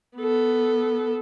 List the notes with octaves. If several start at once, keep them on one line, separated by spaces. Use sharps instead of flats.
B3 A4